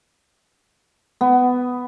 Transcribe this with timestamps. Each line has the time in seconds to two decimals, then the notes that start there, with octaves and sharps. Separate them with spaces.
1.21 B3